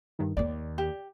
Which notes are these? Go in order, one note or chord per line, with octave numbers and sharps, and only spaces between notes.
G2 D#3
D#2 A#3 D5
G4